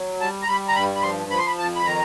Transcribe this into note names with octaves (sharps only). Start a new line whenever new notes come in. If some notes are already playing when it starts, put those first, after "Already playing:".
Already playing: F#3
G3 A5
A#5
G3 B5
A#5
G2 B5
B5
F3 C6
F3 B5
C6
B5
F2 A5
B5
D#3 A#5